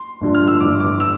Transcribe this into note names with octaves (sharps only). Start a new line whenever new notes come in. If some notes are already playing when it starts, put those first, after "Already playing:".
Already playing: C6
G1 G2 D3 F3
F6
E6
G1 G2 E3 D6
D6
E6